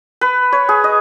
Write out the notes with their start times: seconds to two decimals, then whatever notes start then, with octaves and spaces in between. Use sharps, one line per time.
0.21 B4
0.52 C#5
0.69 G#4
0.84 D#5